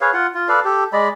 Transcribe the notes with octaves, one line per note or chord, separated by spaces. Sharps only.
G#4 B4 C#5 F5
F4 F#5
F4
A4 B4 D5 F5
G4 A4
G#3 D5 D#5 B5